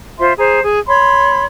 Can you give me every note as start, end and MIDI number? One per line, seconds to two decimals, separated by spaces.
0.19 0.33 65
0.19 0.33 72
0.19 0.33 76
0.19 0.33 84
0.38 0.60 68
0.38 0.60 72
0.38 0.60 82
0.63 0.79 68
0.87 1.45 73
0.87 1.45 83
0.87 1.45 84